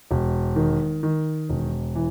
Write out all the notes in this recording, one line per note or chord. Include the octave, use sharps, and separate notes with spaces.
E1
D#3
D#3
E1
E3